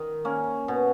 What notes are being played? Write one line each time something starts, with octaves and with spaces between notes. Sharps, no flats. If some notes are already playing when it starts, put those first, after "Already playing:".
Already playing: D#3
A#3 C#4
B2